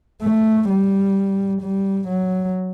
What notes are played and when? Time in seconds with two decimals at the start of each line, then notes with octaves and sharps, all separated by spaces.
0.22 A3
0.70 G3
1.62 G3
2.08 F#3